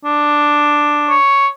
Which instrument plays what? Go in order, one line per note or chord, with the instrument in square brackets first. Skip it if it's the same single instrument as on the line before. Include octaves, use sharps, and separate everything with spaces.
[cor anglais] D4
[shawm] C#5